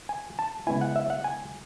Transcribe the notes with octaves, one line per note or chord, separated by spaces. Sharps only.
G#5
A5
C#3 G#3 B3 E4 G#5
F#5
E5
F#5
G#5